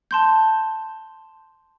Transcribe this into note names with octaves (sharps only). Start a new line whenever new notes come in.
A5 C6 G6